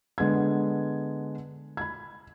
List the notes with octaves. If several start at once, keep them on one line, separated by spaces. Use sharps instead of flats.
D3 G#3 B3 G#6
B5 G#6